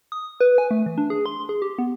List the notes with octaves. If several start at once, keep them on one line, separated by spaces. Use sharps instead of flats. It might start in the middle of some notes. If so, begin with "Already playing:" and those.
D#6
B4
G#5
A3
E3
D4
G#4
C6
G#4
G4
B3